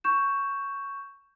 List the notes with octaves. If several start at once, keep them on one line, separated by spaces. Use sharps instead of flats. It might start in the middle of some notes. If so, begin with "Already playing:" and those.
C#6 G6 E7